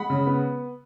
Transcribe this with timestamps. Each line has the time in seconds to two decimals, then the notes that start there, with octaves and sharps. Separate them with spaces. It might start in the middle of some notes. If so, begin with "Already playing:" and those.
Already playing: G#3 F#5 B5
0.10 C#3
0.27 B3